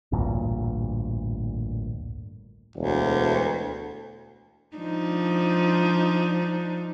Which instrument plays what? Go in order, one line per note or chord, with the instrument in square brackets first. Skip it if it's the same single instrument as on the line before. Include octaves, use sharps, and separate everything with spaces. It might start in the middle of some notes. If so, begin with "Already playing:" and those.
[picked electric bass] A1 D2 G2 A#2
[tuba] E1 [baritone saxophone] D2
[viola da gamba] F3 D4 D#4